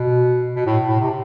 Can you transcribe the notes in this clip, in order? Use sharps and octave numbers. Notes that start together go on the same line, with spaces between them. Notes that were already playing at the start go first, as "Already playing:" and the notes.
Already playing: B2
B2
A2
A2
C3